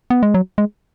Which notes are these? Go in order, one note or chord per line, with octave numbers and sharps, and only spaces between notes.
B3
G#3
F#3
G#3